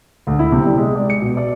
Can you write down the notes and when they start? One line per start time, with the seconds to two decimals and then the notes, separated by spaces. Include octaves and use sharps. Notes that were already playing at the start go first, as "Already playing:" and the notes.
0.27 D2
0.39 E4
0.52 C3
0.66 G3
0.78 G#3
0.96 D5
1.10 C#7
1.22 B2
1.37 D5